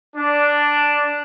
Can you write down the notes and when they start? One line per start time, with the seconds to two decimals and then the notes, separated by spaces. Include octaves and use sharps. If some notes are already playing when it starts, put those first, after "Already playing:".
0.15 D4